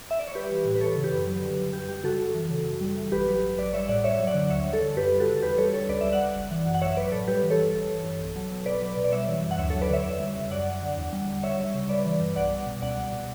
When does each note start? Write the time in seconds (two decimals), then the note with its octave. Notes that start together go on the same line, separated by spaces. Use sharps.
0.11 E5
0.19 D5
0.27 C#5
0.35 G3 G4 B4
0.50 E3
0.65 A2
0.75 B4
0.81 E3 A4 C#5
0.96 C#3
1.04 G4 B4
1.12 F#2
1.27 F#3
1.42 D3
1.58 G2
1.73 F#2 G4
1.89 G3 G4
2.04 C#3 F#4 A4
2.20 F#2
2.35 E3
2.50 C#3
2.66 F#2
2.81 G3
2.97 E3
3.12 A1 G4 B4
3.28 F#3
3.43 G2
3.58 A1 B4 D5
3.73 G3 C#5 E5
3.88 A2 D5 F#5
4.04 F#2 C#5 E5
4.20 F#3
4.27 D5 F#5
4.34 D3
4.50 D2 C#5 E5
4.66 G3
4.73 A4 C#5
4.82 D3
4.96 F#2 G4 B4
5.12 G3
5.20 F#4 A4
5.27 C#3
5.36 A4
5.42 E2 G4 B4
5.58 G3 A4 C#5
5.73 D3 A4 C#5
5.89 C#2 B4 D5
6.01 G3 E5
6.12 D5 F#5
6.20 C#3
6.36 G1
6.51 E3
6.66 F#2
6.74 F#5
6.81 A1 C#5 E5
6.97 F#3 B4 D5
7.08 B4
7.12 A2 A4 C#5
7.27 G3 G4 B4
7.43 E3
7.50 A4 C#5
7.58 G2
7.74 G1
7.89 E3
8.05 G2
8.20 B1
8.36 F#3
8.51 B2
8.66 B1 B4 D5
8.82 F#3
8.97 B2
9.04 D5
9.12 G3 C#5 E5
9.28 E3
9.43 F#2
9.51 F#5
9.58 D2 C#5 E5
9.70 F#3 A4 C#5
9.82 B4 D5
9.90 D3 C#5 E5
10.05 E2
10.20 G3
10.35 C#3
10.51 F#2 D5 F#5
10.66 F#3
10.82 D3
10.97 E2
11.13 G3
11.27 D3
11.43 C#2 C#5 E5
11.59 G3
11.74 C#3
11.89 G3 B4 D5
12.05 E3
12.20 G2
12.36 B1 D5 F#5
12.51 G3
12.66 B2
12.82 C#2 D5 F#5
12.97 G3
13.13 B2